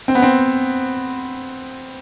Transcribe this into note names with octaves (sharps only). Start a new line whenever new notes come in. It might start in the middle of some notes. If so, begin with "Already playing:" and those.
C4
B3
C4